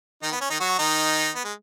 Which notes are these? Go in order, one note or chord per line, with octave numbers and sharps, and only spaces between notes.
D#3 D#4
B3
C#4
D#3 D#4
F#3 F#4
D#3 D#4
B3
G#3